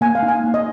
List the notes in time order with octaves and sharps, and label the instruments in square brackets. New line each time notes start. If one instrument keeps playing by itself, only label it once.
[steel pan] A#3 G#5
F5
D#4
G#5
A#3
D#5